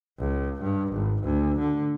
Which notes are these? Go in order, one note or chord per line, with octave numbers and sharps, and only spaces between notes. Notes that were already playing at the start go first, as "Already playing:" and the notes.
C#2
G2
G#1
D2
D3